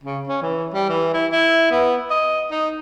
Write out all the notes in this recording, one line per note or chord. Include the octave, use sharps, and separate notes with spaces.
C#3
C#4
E3
G3
E3
E4
E4
B3
D#5
D#4